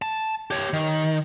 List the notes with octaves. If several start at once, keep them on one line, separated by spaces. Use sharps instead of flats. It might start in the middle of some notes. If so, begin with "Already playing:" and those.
A5
G4 C#5
D#3